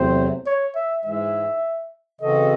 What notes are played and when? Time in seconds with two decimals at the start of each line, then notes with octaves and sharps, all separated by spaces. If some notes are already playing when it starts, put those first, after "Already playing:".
Already playing: E2 C3 F#3 A3 C4 C5
0.46 C#5
0.75 E5
1.04 G#2 E3 G#3 E5
2.21 C#3 E3 C4 F#4 A4 D#5